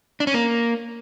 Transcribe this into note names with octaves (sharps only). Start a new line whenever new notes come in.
D4
C#4
A#3